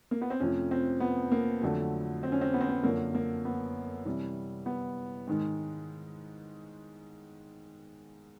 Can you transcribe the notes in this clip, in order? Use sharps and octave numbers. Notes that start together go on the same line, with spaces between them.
A#3
B3
C4
F2 C3 F3 A3 C#4
C4
B3
A#3
F2 D3 F#3 A3
C4
C#4
C4
B3
C4
B3
F#2 D3 F3 A#3
A#3
B3
C3 E3 G3
B3
G#2 D#3 G#3